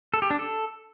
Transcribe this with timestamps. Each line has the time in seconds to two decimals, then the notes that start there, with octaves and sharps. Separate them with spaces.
0.14 A4
0.22 G4
0.30 D4
0.39 A4